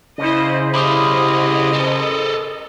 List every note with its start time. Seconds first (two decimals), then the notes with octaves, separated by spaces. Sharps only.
0.18 C#3 E4 C5 D#5
0.74 E4 G4 D#5 B5 D6 D#6
1.73 A4 A#4